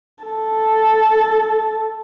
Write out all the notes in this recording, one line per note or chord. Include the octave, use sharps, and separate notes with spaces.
A4